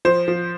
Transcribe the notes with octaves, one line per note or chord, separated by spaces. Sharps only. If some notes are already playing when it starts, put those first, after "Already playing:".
F3 C5
F3